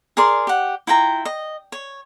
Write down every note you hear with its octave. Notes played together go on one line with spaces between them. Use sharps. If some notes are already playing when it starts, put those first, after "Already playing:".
G#4 A#4 D5 C6
G4 F#5
E4 F4 G5 A#5
D#5
C#5